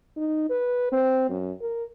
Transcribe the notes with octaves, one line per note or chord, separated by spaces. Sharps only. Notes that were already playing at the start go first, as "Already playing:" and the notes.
D#4
B4
C4
F#2
A#4